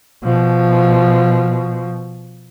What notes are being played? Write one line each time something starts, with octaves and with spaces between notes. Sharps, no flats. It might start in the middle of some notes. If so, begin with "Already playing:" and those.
B2 F3